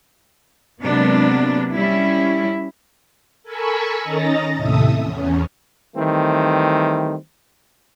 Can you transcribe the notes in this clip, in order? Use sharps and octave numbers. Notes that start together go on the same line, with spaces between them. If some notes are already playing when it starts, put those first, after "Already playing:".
C3 F#3 G#3 A#3 B3 D4
G3 C#4 E4
A4 A#4 G#5 B5 C#6 E6
D#3 C#4 D#5 A#5 A6 A#6
D#2 A2 C3 A4 E5 D#6
E2 C#4
D#3 E3 G3 A3 C4